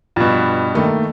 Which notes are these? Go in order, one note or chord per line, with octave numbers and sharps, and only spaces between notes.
G2 B2 F3
D#3 A3 A#3